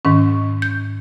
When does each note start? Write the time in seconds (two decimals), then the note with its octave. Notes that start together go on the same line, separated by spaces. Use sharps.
0.05 G#2 D#3 C#4
0.62 G6